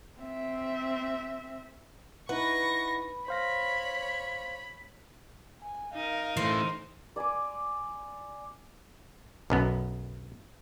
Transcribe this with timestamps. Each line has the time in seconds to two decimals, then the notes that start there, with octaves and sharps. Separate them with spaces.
0.21 C4 E5
2.29 D#4 E4 B4 F#5 C#6 A#6
3.28 C5 C#5 F5 B5 A#6
5.62 G#5
5.94 D#4 A#4 F5
6.37 E3 A3 C5
7.16 D5 G#5 C6 D6
9.50 B1 F#2 B3